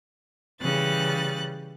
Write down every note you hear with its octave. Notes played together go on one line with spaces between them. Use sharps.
C#3 E3 G3 F#6 A6